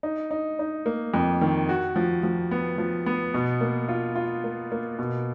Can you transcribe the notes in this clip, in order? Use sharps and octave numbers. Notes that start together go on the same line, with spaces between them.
D#4
D#4
D#4
A#3
F2
D#3
F#4
F3
F3
B3
F3
B3
B2
A#3
F4
F4
A#3
A#3
B2